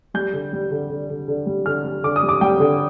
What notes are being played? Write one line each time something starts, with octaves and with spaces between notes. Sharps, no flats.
G3 G6
D3
G3
D3
D3
D3
D3
G3
D3 F6
G3
D3 D6
D#6
G3
D6
G3 G5
D3